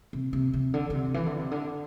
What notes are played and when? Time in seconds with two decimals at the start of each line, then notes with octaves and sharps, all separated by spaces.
0.13 C3
0.33 C3
0.53 C3
0.74 D3
0.90 D3
0.94 C3
1.14 E3
1.26 D3
1.39 C3
1.51 D3